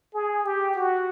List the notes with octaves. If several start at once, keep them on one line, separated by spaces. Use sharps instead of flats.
G#4
G4
F#4